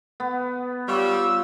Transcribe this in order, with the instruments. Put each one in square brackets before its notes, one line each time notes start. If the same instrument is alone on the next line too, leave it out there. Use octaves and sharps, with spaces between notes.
[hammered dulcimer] B3
[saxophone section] G3 [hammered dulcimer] F4 C#5 [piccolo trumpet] E6